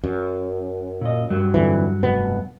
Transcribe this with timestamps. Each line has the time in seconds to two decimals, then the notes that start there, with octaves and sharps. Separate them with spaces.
0.04 F#2
1.01 A#2 D#5
1.30 G2 F#3
1.54 F2 D3 E3
2.03 F1 B2 B3